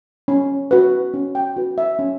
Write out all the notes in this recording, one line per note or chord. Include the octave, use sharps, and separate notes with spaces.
C#4
F#4 B4
C#4
G5
F#4 B4
E5
C#4